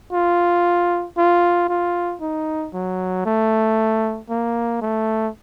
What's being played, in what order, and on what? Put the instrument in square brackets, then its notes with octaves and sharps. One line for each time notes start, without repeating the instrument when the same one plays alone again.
[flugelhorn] F4
F4
F4
D#4
F#3
A3
A#3
A3